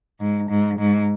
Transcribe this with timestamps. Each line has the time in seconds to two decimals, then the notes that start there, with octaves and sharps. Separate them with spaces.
0.20 G#2
0.50 G#2
0.79 G#2